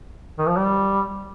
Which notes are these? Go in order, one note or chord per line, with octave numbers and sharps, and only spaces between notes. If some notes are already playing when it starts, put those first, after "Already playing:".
D#3
F3
G3